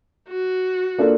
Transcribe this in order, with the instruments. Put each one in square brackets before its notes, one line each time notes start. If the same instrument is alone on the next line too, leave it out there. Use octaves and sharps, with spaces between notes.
[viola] F#4
[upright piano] A#3 D4 F4 A4